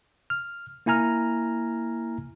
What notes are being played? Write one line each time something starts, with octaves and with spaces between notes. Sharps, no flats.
F6
A#3 E4 G#5 A#5 F6